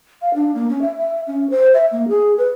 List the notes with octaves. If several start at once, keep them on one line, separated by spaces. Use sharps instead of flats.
F5
D4
A#3
C#4
E5
E5
C#4
C5
E5
A#3
G#4
B4